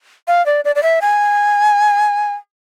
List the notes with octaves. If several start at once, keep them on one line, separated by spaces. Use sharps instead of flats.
F5
D5
D5
D5
E5
G#5